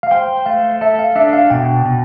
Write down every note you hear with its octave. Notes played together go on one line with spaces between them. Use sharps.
F5
C5 G5
A3 F5
A4 E5
F5
D4 E5
F5
B2 G5
B2